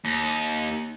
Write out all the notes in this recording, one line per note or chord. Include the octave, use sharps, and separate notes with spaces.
D#2